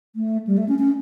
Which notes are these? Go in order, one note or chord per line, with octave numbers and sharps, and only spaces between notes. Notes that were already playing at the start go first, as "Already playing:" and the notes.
A3
G3
A3
C#4
C#4